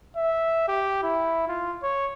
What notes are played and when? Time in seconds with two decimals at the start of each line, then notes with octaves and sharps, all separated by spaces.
0.16 E5
0.68 G4
1.03 E4
1.48 F4
1.83 C#5